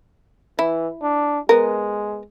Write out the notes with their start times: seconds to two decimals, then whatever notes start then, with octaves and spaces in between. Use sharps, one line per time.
0.59 E3 E4
1.03 D4
1.49 G#3 B3 A#4